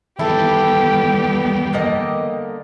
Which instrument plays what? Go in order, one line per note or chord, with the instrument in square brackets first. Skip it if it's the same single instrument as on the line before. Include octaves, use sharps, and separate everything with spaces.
[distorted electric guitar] E2 D#3 [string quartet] G3 B3 [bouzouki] E4 A4 [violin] G4
[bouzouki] D3 A#3 D#5